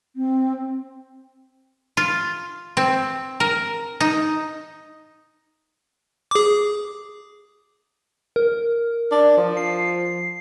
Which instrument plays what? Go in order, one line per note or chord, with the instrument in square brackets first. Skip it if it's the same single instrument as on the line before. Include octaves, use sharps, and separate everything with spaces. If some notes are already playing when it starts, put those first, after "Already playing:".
[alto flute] C4
[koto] F4
C4
A#4
D#4
[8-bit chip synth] G#4 D6
[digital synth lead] A#4
[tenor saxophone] D4
F3
[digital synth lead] C7